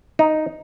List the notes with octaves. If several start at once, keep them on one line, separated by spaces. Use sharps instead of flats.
D#4